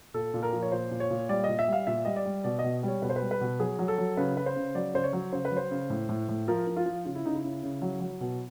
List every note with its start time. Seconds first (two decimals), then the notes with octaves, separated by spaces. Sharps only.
0.14 A#2 A4
0.34 A#2
0.43 A#4
0.53 F3
0.62 C#5
0.72 A#2 C5
0.91 A#2
1.00 C#5
1.10 A#2
1.29 G3 D5
1.44 A#2 D#5
1.59 E5
1.68 G3 F5
1.87 A#2 E5
2.05 G3 D#5
2.16 D5
2.26 G3
2.44 B2 D5
2.59 D#5
2.64 B2
2.83 G3 C#5
3.02 B2 B4
3.10 C5
3.16 B4
3.21 G3
3.31 B4
3.41 B2
3.60 F#3 G#4
3.79 F#3
3.88 A4
3.98 F#3
4.17 C#3 B4
4.36 C#3 B4
4.46 C5
4.56 C#3
4.75 F#3 D5
4.94 C#3 C5
5.04 C#5
5.13 F#3
5.33 C#3 C5
5.45 B4
5.51 F#3
5.57 C5
5.71 C#3
5.90 A2
6.09 A2
6.29 A2
6.48 F3 A#4
6.67 F3
6.76 F4
6.86 F3
7.05 C#3 F4
7.15 E4
7.25 C#3 D#4
7.35 E4
7.44 C#3
7.63 C#3
7.82 F#3
8.01 F#3
8.21 B2